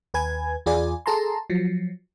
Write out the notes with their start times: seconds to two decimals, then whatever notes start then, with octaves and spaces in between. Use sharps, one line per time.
0.14 D#2 B4 G#5 G#6
0.66 E2 F4 G#4 D5 G#5
1.06 G#4 A4 A5 A#5 C6
1.50 F3 F#3